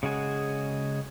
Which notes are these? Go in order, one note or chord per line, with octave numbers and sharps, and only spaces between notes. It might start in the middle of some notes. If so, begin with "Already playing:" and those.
C#3 G#3 F#4 G#4